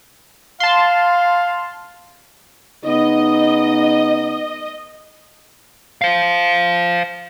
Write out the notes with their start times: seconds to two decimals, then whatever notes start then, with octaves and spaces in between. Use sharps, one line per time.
0.60 F5 A5 C6
2.85 C#3 B3 D#4 D#5
6.02 C5 F5